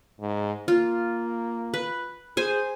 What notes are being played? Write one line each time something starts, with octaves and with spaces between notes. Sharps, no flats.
G#2
A#3 F4
B4
G#4 C5 G#5